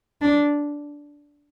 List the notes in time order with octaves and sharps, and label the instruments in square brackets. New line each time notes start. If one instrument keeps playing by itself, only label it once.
[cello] D4